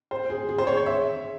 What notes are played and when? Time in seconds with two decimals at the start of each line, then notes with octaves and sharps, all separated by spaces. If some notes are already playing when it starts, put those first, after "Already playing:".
0.11 C5
0.30 G#4
0.49 G#4
0.58 C5
0.67 C#5
0.77 C#5
0.86 E5